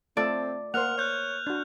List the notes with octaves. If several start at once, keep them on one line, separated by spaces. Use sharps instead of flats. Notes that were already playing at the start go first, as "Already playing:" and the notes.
A3 C4 F4 A4 D5
A#3 C5 F#5 F6 F7
C#5 F#6 G6 F7
D4 F#4